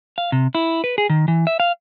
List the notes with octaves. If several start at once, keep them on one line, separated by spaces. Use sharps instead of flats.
F5
C3
E4
B4
G#4
D#3
E3
E5
F5